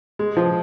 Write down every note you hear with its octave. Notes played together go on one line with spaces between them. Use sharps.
G#3
F3